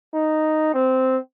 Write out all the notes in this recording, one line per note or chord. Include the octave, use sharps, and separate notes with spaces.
D#4
C4